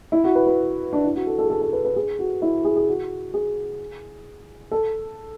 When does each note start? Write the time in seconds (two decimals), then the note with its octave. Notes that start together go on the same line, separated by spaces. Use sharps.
0.12 E4
0.24 F#4
0.35 B4
0.47 B4
0.93 D4
1.04 E4
1.16 F#4
1.27 A4
1.39 A4
1.45 G#4
1.50 A4
1.61 A4
1.73 B4
1.85 B4
1.96 G#4
2.19 F#4
2.42 E4
2.65 G#4
2.76 G#4
2.88 F#4
3.34 G#4
4.71 A4